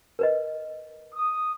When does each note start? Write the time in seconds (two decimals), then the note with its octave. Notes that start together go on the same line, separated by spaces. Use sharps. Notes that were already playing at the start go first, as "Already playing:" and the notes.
0.19 A#4 B4 D#5
1.15 D#6